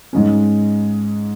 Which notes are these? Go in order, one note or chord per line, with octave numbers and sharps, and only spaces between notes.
G#2 G#3 C#4